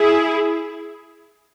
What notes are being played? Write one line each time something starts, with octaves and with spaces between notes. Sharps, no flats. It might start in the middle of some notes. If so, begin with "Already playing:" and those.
Already playing: E4 G#4